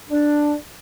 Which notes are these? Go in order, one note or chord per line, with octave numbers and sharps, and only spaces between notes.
D4